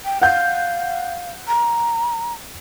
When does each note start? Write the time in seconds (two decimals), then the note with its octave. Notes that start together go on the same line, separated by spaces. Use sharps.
0.05 G5
0.22 F5 F#5 G6
1.47 A#5